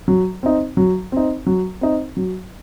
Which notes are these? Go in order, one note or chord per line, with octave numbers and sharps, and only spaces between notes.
F#3
C4 D#4
F#3
C4 D#4
F#3
C4 D#4
F#3